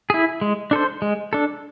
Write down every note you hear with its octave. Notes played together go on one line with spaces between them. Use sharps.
E4 G#4
G#3
D4 A4 C5
G#3
D4 A4